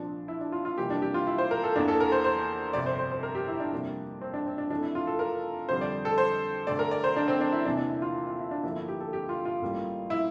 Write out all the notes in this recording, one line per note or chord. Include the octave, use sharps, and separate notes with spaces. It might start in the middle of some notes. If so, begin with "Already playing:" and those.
Already playing: C2 A#2 F3 D4
E4
D4
F4
F4
F2 C3 E3 G3 A#3 G4
D4
G4
F4
E4
C5
A#4
A4
E2 E3 A#3 D4
A4
A#4
C5
C5
G1 F2 C3 D5
C5
C5
C5
A#4
G4
E4
D4
F2 C3 G3 A#3
C4
D4
C4
D4
F2 E3 A3 D4
E4
F4
A4
A#4
F2 D3 G3 C5
D5
A4
C5
D2 D3 A3 D5
A#4
D5
C5
D4
C4
D4
E4
E2 C3 E3 A#3 D4
D4
E4
F4
F4
E4
D4
G1 G2 D3 F3 A#3 E4
E4
G4
A4
G4
F4
F4
A1 A2 G3 A#3
E4